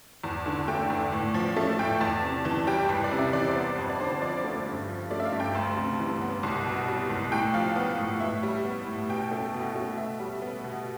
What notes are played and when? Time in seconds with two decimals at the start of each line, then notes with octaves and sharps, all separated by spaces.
0.24 E2 A5
0.45 D3 A5
0.68 A3 G5
0.90 E2
1.12 A2
1.34 F3
1.56 A3 A5
1.78 A2 G5
2.01 E2 A5
2.23 C3
2.45 E3 A5
2.67 G3 G5
2.89 C2 B4
3.04 D5
3.11 C3
3.19 E5
3.33 E3 D5
3.48 C5
3.56 B3
3.78 F2 C5
3.90 D5
4.00 D3 C5
4.11 C5
4.22 F3 D5
4.44 A3
4.66 G2
4.88 F3
5.11 A3 D5
5.20 E5
5.25 F5
5.32 G2
5.40 G5
5.55 D2 A5
5.77 C3
5.99 E3
6.21 B3
6.43 C2
6.66 B2
6.88 G3
7.10 C2
7.32 A2 G5
7.54 F3 F5
7.76 B3
7.98 A2
8.20 A2 E5
8.43 G3
8.65 B3
8.87 A2
9.09 B2 G5
9.31 A3
9.54 B2
9.75 A3
9.98 B2 E5
10.19 G3
10.42 B3
10.64 B2